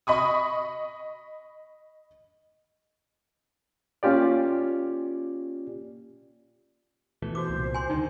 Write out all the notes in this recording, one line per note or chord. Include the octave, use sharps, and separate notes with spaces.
D#5 B5 C#6 D#6
A#3 C#4 F4 G4 D5
B2 E3 A3
F#4 C5 D6
C2 A#2
G#5 C6
D#2 D3 D#3 D#4